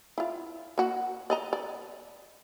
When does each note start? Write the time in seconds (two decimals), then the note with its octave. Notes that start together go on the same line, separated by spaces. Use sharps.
0.18 E4 F4
0.78 A#3 F#4
1.30 D5 D#5 A#5
1.53 D5